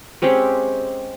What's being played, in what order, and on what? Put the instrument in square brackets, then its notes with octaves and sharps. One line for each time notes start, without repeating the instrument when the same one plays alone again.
[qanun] G#3 C4 C#4 G4